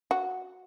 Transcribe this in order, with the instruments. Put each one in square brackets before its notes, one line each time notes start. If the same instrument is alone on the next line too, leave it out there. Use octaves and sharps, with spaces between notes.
[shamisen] F#4